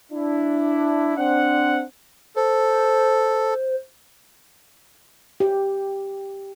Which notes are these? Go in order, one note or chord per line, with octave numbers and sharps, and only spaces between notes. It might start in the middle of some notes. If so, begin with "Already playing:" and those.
D4 E4
C4 D4 F#5
A4 C5
G4